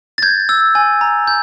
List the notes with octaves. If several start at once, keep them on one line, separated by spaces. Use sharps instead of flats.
A6
G6 G#6
E6
G#5
A#5
G6